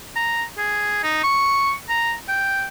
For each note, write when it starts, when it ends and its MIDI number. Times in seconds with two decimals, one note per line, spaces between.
0.16 0.44 82
0.58 1.03 68
1.03 1.22 63
1.23 1.72 85
1.89 2.14 82
2.29 2.67 79